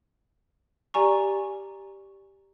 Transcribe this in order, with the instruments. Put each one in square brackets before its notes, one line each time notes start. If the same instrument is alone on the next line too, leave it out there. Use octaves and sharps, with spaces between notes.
[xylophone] G4 D5 G#5 A#5 C#6